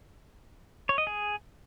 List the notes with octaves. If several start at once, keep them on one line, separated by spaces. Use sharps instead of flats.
C#5
D#5
G#4